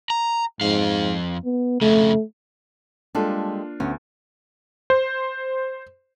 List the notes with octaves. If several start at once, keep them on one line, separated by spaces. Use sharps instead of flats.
A#5
F2 G#2 F5
B3
F2 C#3 A3
G3 G#3 A#3 D4 F4 A4
D2 B3 C#4
C5